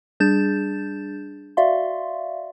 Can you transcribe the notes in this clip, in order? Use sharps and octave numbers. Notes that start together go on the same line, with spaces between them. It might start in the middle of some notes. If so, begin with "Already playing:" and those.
G3 D4 G#4 G6 A6 E7
F#4 D5 E5 F5 C6